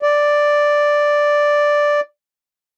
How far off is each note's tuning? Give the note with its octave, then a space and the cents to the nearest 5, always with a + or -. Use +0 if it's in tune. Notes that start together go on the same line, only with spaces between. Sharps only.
D5 +0